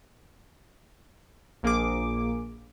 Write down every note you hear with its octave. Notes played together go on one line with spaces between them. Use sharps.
A#1 A#3 G#4 D6